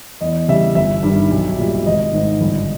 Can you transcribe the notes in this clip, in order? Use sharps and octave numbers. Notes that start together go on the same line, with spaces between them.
E2 D#5
C#3 G3 E5
G1 E5
G2 D#3 G3
B1
A#2 G3
G#1 D#5
G#2 D#3
G1